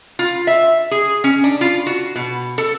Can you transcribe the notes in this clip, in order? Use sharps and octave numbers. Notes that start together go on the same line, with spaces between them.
F4
E5
G#4
C#4
D4
F4
F#4
B2
A4